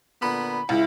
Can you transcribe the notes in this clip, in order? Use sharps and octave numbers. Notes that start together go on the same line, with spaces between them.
A#2 D3 B3 B5
C#2 E4